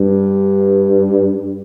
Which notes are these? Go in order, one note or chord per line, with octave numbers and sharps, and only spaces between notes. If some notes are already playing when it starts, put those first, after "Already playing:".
Already playing: G2